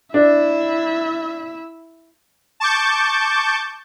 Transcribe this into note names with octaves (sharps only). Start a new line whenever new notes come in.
D4 E4 E5
A5 C#6 D6 G6